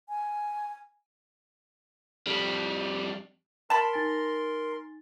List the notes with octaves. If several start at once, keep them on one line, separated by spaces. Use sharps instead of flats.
G#5
F2 G3
A#4 A5 B5 C6
D#4 G#5 A6